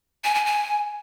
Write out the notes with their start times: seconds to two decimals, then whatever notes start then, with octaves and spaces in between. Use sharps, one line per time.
0.24 G#5
0.35 G#5
0.46 G#5